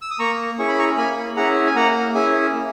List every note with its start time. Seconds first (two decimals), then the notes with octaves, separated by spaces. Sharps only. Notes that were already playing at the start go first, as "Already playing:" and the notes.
0.02 E6
0.11 D#6
0.19 A#3 A#5 C#6
0.58 C#4 E4 G#4 C#6
0.68 B5
0.79 A#5 C#6
0.97 A#3 G#5 B5
1.37 C#4 E4 G#4 F#5 A#5
1.67 G#5
1.76 A#3 F#5 A#5
2.15 C#4 E4 G#4 E5 G#5
2.54 A#3